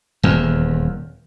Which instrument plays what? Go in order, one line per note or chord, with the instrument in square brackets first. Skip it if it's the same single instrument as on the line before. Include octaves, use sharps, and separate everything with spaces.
[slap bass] D#1 E2